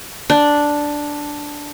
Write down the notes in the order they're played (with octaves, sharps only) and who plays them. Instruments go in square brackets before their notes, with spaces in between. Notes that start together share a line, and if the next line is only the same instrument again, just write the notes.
[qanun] D4